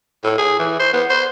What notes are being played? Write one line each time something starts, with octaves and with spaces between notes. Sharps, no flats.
A2
G#4
E3
C5
B3
C5